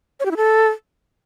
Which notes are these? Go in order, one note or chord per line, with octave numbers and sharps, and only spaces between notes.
C#5
G4
E4
A4